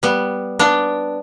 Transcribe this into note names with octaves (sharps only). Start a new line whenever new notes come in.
G3 B3
B3 D4